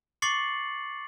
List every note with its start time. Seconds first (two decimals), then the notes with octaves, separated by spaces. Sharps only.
0.22 C#6 D6 A6 C7 C#7 F#7